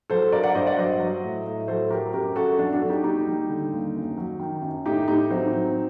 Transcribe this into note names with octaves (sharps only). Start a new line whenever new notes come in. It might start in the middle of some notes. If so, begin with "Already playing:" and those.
F#3 A4 C5
G2 A#4 D5
D5 F#5
G2 C5 D#5
D5 F#5
F#3 C5 D#5
F#3
A2
A2
F#3 A4 C5
F#3 G4 A#4
F#2 G4 A#4
F#2 F#4 A4
F#3 D4 F#4
D4 F#4
F#3 A4
D#4 G4
D#2 D#4 G4
G3
D3
D#2
F#2
F#3
D#3
F#2
A2 D#4 G4
A2 D#4 G4
F#3 C4 D#4
F#3